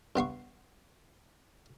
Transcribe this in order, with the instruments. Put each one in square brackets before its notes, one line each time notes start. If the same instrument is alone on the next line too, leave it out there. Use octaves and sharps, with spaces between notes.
[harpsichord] G2 B3 C6 C#6